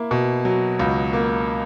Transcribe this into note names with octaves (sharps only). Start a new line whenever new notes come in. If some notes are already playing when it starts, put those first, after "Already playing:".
Already playing: A#3 E4
B2
F#3
C#2
A#3